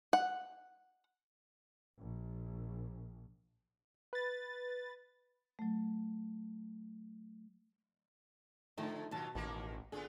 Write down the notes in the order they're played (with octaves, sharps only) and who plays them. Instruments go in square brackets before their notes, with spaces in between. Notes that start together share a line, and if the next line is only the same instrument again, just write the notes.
[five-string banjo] F#5
[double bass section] A#1
[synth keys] B4 A6
[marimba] F#3 A3
[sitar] D3 [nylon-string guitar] D#3 F3 A3
[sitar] D#2 F#3 F4 [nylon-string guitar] B2 A5
[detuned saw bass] A1 [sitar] D#3 A#3 A#4
[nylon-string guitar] D3 [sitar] B3 F4 G#4